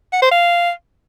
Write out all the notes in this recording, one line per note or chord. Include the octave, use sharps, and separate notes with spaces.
F#5
C5
F5